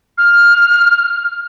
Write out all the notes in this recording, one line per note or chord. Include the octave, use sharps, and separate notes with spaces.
F6